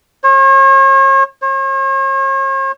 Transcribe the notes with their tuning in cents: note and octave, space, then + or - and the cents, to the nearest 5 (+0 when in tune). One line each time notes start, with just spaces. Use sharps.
C#5 -40
C#5 -45